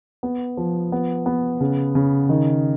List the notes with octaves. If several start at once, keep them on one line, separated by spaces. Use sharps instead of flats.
B3
F3
B3
B3
C#3
C#3
D#3